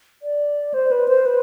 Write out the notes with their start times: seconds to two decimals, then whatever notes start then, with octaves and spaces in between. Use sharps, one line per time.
0.22 D5
0.74 C5
0.91 B4
1.08 C5
1.26 B4